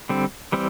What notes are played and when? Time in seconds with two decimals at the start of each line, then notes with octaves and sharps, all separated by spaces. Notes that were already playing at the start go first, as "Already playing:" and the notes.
0.09 D3 G3 C4
0.52 E3 G3 C4